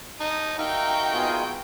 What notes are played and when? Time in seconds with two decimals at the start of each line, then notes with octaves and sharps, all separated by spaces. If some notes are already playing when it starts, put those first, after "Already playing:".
0.20 D#4 A5 D#6
0.58 D#4 F#4 A#4 E5 F5 G5
1.13 B2 F4 G#4